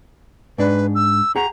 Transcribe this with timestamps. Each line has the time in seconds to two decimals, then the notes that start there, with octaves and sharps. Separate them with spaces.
0.58 G#2 D4 B4
0.95 E6
1.36 G#4 F#5 G5 A#5